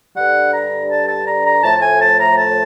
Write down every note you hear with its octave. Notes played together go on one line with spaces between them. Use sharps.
G2 D3 G3 F#5
A#5
A5
A5
A#5
A#5
A2 F3 A3 A5
A5
G#5
A5
A#5
A5